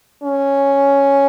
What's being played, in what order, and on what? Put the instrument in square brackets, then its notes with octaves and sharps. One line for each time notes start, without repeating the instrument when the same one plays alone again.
[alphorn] C#4